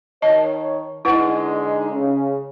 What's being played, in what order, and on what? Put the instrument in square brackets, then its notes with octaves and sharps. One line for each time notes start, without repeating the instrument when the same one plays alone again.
[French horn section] D#3 C#5 [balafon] D#5 A5
[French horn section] D3 G#3 D#4 [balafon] E4 B4 F#5
[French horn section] C#3